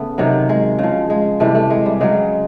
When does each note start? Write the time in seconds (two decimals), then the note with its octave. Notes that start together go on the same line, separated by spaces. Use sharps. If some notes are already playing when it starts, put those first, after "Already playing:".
Already playing: C#3 A3 B3
0.18 C3 D#3 F#3
0.49 G#3
0.79 C#3 F3
1.10 G#3
1.40 C3 E3 G3 A3
1.55 A3
1.70 G#3
1.86 G3
2.01 C#3 F#3 G#3